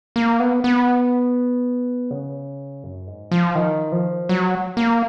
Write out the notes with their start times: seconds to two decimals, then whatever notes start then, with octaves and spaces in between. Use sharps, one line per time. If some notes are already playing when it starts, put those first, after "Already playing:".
0.16 A#3
0.40 B3
0.64 B3
2.11 C#3
2.84 F#2
3.07 G#2
3.32 F3
3.55 D#3
3.92 F3
4.29 F#3
4.77 A#3